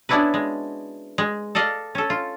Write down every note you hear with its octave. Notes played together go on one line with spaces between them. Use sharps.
B3 C#4 D4 E4 F#4 B4
G#3
G#3
A4 D5 D#5 F5
C#4 A4
F4